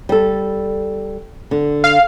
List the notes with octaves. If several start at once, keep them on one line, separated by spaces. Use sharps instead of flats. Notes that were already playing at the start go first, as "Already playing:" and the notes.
G3 A4
D3
F5